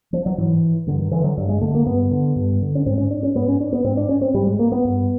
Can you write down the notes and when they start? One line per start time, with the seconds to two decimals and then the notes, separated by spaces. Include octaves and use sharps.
0.13 F3
0.26 F#3
0.38 G#2 E3
0.87 G2 D3
0.99 D#3
1.11 D3 E3
1.24 F#3
1.37 G2 G3
1.49 G#3
1.62 D3 A3
1.75 A#3
1.86 G2 B3
2.11 D3
2.36 G2
2.61 D3
2.75 C#4
2.86 G#2 C4
2.98 C#4
3.11 D4
3.23 C#4
3.35 G#2 B3
3.48 C#4
3.60 D4
3.73 B3
3.84 G#2 C4
3.97 D4
4.09 C#4
4.21 C4
4.34 G#2 G3
4.47 G#3
4.59 A#3
4.72 B3
4.84 G2